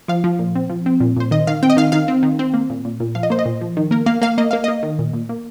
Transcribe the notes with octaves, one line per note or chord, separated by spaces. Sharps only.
F3 F5
F3
A#2
C4
F3
C4
A#2
A#2 C5
D#3 D#5
D#3 F5
C4 G5
D#5
D#3 F5
D#3 F5
C4
D#3
C4
A#3
A#2
A#2
A#2
F3 F5
D#5
A#3 C5
D#5
A#2
F3
D#3
A#3 A#4
A#3 F5
A#3 F5
A#3 D#5
A#3 F5
A#3 D#5
D#3
A#2
A#2
A#3